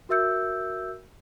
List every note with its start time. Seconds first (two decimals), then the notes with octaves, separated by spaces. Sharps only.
0.09 F#4 A#4 E5 E6 G6 C#7